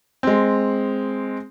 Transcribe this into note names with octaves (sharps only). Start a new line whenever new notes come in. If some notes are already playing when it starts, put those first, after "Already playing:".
G#3 C4